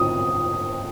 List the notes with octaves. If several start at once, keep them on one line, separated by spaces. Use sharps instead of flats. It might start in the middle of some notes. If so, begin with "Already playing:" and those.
Already playing: D#6